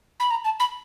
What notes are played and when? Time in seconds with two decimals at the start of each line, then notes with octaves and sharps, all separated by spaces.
0.20 B5
0.31 A#5
0.44 A5
0.60 B5